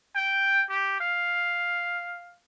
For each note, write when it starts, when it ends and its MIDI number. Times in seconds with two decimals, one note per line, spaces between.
0.15 0.64 79
0.69 1.00 67
1.01 2.37 77